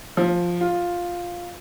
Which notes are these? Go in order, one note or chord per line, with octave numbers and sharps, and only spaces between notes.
F3
F4